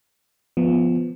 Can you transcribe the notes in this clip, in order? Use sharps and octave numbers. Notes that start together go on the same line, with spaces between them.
F3 B3